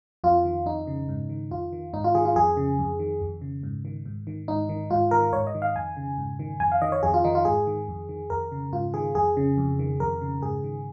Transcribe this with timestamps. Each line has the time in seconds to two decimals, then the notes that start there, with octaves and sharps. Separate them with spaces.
0.24 F2 F4
0.45 D#3
0.66 F2 D#4
0.87 C#3
1.09 G#2
1.29 D#3
1.51 F2 F4
1.73 D#3
1.93 G#2 D#4
2.04 F4
2.15 D#3 G#4
2.25 F4
2.36 F2 G#4
2.57 C#3
2.79 F2
2.99 D#3
3.21 F2
3.41 C#3
3.63 G#2
3.85 D#3
4.06 G#2
4.27 D#3
4.48 G#2 D#4
4.69 D#3
4.91 G#2 F4
5.11 D#3 A#4
5.33 G#2 C#5
5.47 D#5
5.55 D#3
5.62 F5
5.75 F2 G#5
5.97 C#3
6.18 G#2
6.39 D#3
6.60 F2 G#5
6.72 F5
6.82 D#3 D#5
6.92 C#5
7.03 F2 G#4
7.14 F4
7.24 D#3 D#4
7.35 F4
7.45 G#2 G#4
7.67 D#3
7.88 F2
8.09 D#3
8.30 F2 A#4
8.52 C#3
8.73 G#2 F4
8.94 D#3 G#4
9.15 F2 G#4
9.37 C#3
9.58 F2
9.79 D#3
10.00 F2 A#4
10.21 C#3
10.42 G#2 G#4
10.64 D#3